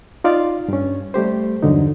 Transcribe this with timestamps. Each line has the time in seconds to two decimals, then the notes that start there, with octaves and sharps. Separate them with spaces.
0.24 D#4 F4 D5 F5
0.68 G2 C#4
1.14 G3 A3 G4 C5
1.62 E2 G2 D3 F#3 D#4